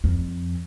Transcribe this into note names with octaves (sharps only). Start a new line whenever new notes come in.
F2